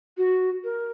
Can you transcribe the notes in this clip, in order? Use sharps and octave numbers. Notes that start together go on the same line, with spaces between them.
F#4
A#4